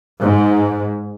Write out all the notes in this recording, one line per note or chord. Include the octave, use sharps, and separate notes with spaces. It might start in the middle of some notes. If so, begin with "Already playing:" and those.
G#2